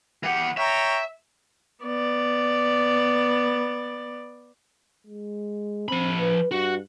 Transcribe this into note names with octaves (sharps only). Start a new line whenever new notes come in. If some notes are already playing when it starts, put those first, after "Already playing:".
E3 G4 F#5
C#5 E5 G5 A#5
B3 D5
G#3
F3 C4 B5
B4
G2 F#4